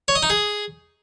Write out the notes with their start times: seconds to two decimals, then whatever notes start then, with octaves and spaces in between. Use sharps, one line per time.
0.08 C#5
0.15 D#5
0.23 D#4
0.30 G#4